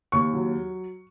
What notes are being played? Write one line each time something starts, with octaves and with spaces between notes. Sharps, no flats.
D#2 C#6
F#3